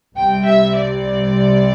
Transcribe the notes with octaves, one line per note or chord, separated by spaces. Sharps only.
C2 C3 G3 G5
E5
D5